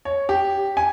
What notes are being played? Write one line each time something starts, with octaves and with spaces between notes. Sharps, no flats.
C#5
G4
G#5